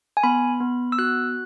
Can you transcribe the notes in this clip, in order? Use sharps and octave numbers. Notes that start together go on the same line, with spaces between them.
G#5
B3 B5
B3
E6
F#4 F#6